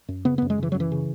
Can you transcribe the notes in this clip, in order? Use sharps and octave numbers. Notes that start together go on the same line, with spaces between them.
F#2
C#3 B3
B3
F#2
G#3
C#3 E3
F#2 F#3
E3
C#3